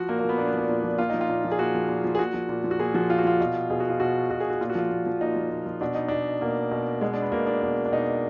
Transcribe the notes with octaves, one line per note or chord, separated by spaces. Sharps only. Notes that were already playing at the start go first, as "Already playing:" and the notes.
Already playing: F3 F#4
A#2 A#3
A#3
F3
B3
A#2 D4
B3
F3 D4
A#2
F3
A#2 F4
F3 D#4
F4
A#2
F3
G#4
A#2 F#4
F3
A#2
F3
G#4
A#2 F#4
F3
A#2
F3
F#4
A#2 G#4
F3 F#4
A#2 F4
F#4
F3 F4
B2
B2 G#4
F#4
F4
B2 F#4
B2 F#4
G#4
F#4
A#2 F4
F#4
F3 F4
A#2
F3
A#2 D#4
F3
A#2
F3
B2 D4
D#4
B2 D4
B2 A#3
B2
B2 G#3
D4
B3
B2 A#3
D4
B2
D4
B2 D#4